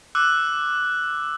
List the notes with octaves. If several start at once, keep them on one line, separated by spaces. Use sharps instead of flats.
D6 E6 F#6